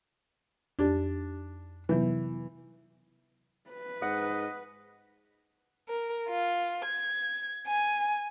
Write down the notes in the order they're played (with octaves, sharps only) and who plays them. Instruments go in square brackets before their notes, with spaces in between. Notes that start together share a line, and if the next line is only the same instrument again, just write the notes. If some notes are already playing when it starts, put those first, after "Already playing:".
[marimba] F2 G4 [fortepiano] D4
[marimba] C3 F#3 B3 [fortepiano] E3
[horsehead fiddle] B4
[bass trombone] G#2 [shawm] D#5 [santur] F#5
[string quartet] A#4
F4
G#6
G#5